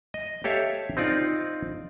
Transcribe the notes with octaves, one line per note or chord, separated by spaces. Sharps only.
D#5
G4 A4 C#5 E5 F5
C4 D#4 F4 D5